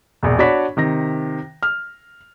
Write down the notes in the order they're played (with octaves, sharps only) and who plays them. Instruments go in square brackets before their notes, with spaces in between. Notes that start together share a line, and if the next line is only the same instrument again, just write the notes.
[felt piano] E1 A#1
D4 F#4 C#5 D5 B5 B6
C3 D#3 A#6
F6